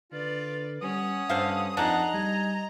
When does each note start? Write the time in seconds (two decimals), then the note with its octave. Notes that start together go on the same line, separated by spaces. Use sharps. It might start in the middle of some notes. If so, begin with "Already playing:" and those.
0.12 D3 F4 B4 D5
0.82 G3 C#4 F#5 D#6
1.29 G2 D3 C5 F5
1.77 F2 D4 D#4 G#4 D#5 F#5 A#5
2.14 G3 G#5